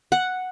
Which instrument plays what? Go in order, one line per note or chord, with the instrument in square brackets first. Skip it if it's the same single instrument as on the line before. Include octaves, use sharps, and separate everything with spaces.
[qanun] F#5